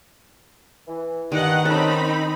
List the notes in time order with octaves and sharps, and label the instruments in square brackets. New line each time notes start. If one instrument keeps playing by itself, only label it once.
[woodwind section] E3
[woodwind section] G2 [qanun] D#3 [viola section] D#5 F#5
[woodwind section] D#3 C#4 [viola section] C4 D#4 B5 [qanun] A4